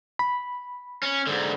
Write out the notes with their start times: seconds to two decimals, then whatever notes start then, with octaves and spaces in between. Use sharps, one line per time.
0.19 B5
1.03 C#4
1.27 G#2 D3